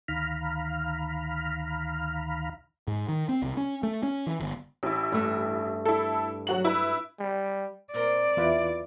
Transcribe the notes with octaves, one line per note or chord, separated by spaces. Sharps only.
D2 D#3 F5 A#5 B5 F6
G#2
D#3
C4
C2
C#4
A3
C#4
E3
G1
A1 E4
G2 A3
E4 A4
F#3 F#4 F#7
E4 B4
G3
A#2 C4 A#4 D5
E2 E4 F4 B4